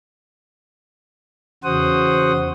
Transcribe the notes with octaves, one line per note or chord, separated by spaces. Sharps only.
E2 C#3 F#4 C5 F#5 D#6